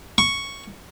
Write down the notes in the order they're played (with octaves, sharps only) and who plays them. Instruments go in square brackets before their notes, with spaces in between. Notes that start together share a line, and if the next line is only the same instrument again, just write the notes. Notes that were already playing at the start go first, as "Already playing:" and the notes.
[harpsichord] C#6